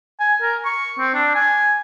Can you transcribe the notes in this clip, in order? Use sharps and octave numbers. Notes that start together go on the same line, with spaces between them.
G#5
A#4
C#6
C4
D4
G#5